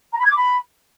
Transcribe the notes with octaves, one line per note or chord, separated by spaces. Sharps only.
A#5
B5
G#6
D6
B5